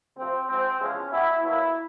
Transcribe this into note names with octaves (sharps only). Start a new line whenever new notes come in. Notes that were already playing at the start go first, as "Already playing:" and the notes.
D2 C3 F3 C4
G#2 F3 G#3 C4
E2 C3 F3 G#3 C4 C#4
B2 G3 B3 E4
B2 F#3 A#3 E4